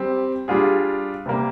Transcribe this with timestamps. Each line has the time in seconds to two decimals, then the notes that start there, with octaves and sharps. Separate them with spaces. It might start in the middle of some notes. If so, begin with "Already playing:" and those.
Already playing: G3 C4 G4
0.48 G3 D4 F4 G#4
1.26 C3 G3 A#3